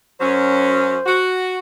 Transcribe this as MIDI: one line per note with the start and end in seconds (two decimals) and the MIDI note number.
0.20 0.96 42
0.20 0.96 54
0.20 0.96 61
0.20 1.21 72
1.05 1.58 66